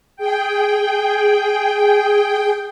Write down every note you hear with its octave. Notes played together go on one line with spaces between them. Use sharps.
G#4 G5